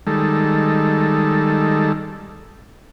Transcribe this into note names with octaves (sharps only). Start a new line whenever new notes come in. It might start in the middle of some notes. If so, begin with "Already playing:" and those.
D#3 G3 G#3 A4